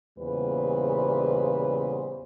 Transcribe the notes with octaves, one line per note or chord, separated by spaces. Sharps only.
E2 A#2 C#3 G3 B4 C5